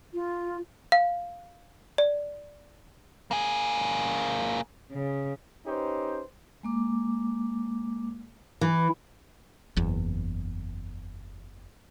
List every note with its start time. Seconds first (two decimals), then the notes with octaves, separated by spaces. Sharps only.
0.14 F4
0.92 F5
1.98 D5
3.31 A#3 G#4
4.93 C#3
5.66 C#4 D#4 G4 B4 C5
6.63 G#3 A#3 D6
8.61 E3
9.77 F#1 E2